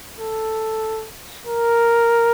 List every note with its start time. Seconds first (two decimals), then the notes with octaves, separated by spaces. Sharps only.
0.18 A4
1.47 A#4